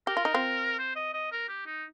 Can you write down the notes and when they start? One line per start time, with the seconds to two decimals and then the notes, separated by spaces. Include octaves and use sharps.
0.07 G4 A#4
0.17 F4
0.25 D#4
0.34 C4 F4
0.79 C5
0.96 D#5
1.14 D#5
1.32 A#4
1.49 G4
1.66 D#4